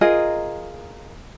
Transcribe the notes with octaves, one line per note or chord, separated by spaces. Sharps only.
F4 G#4 A#4 D#5